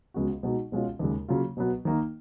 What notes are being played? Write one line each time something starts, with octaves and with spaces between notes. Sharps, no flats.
C#2 C#3 G#3 B3 F#4
B2 G#3 D#4 F#4
B2 G#3 C#4 F4
D#2 C#3 G#3
C#3 F#3 A#3 F4
B2 F#3 B3
D#3 A#3 D#4